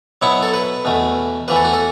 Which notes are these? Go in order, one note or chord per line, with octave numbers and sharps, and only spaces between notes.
B2 F#3 B3 E4 C#6
A4
B4
E2 B2 A3
E2 E3 A3 B4
A4
F#4
A4